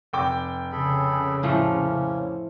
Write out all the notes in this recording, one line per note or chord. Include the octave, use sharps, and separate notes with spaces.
F1 G5 D6
C#3 G#4 A4 B5
A2 F3 A3 A#3 C#4